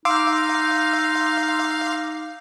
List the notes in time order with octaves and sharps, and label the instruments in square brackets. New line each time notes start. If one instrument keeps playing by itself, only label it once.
[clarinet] D#4 [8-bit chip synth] F5 [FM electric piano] C6 D6 E6